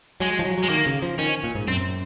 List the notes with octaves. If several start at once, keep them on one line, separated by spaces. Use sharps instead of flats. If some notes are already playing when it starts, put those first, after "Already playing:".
F#3 G#3
F3
F#3
F#3
G#3
D#3 A#3
C#3
F3
D#3 C#4
A#2
G#2
F#2 C4